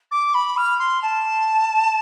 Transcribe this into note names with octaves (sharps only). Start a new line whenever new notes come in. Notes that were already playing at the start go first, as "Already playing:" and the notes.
D6
B5
F6
C6
A5